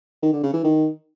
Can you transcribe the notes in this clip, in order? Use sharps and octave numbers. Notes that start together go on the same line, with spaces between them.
D#3
D3
C#3
E3
D#3